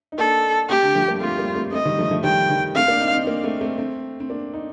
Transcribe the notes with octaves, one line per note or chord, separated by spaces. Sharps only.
D#4
A#3 D4 A4
A3 C4 G4
D3
F3 A3
G3 A#3
A3 C4 F4
G3 A#3
A3 C4
A3 C4 D#5
D#3 G3
F3 A3
F3 A3
D#3 G3 G5
D#3
A3 C4 F5
A#3 D4
C4 D#4
C4 D#4
A#3 D4
A3 C4
A3 C4
A3 C4
C4
A#3 D4
D#4